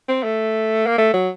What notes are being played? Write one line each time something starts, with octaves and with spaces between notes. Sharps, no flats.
C4
A3
A#3
A3
F#3